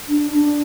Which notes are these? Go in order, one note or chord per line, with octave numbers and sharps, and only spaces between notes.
D4
D4